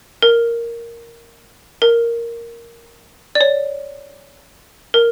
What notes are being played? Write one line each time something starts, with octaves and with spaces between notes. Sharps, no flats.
A#4
A#4
D5
C#5
A#4